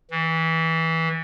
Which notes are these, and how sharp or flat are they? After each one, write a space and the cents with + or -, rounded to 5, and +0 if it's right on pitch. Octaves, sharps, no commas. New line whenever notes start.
E3 -20